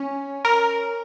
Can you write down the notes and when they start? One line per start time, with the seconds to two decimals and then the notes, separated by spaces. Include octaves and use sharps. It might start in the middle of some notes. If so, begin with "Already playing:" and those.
Already playing: C#4
0.45 A#4